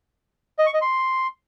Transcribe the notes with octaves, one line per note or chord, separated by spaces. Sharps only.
D#5
C#6
D#5
C6